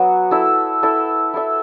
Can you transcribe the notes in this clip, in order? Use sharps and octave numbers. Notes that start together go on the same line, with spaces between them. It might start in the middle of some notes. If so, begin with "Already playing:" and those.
Already playing: F#3 B3 F#4 C#5
E4 A4 E5
E4 A4 E5
E4 A4 E5